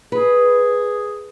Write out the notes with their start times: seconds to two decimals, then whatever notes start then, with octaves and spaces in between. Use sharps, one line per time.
0.12 G#4 B4